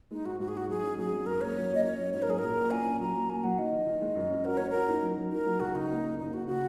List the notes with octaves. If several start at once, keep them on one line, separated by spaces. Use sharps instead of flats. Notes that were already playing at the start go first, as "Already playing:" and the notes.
G#3 D#4
G#2 F#4
G#2 F#4
G#4
D#4 F#4
F#3 G#4
C#4
F#3 G#4
G#1
F#2 A#4
A#3 C#5
F#3
A#3 D#5
C#4 C#5
F#3
G#2 C#5
A#4
F#3 G#4
A#2 A#4
A#1
C#4 G#5
C#4
F#3 A#5
A#3
A#3 G#5
F#3 F#5
D#3 D#5
D#3
D#3
G#3
F#2
C#4
F#4 A#4
C#4 C#5
F#4 A#4
D#4
F#3
F#3
D#4 A#4
F#3
C#2 F#4
C#3 D#4
A#3
C#3
F#1 D#4
C#3 F#4
C#3 F#4